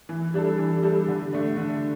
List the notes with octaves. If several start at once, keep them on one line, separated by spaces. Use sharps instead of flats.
E3
G3 D4 A4
E3
G3 D4 A4
D3
A3 D4
D3